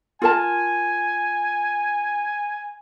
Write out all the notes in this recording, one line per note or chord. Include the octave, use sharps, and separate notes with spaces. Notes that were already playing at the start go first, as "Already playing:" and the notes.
F4 A#4 G#5 A5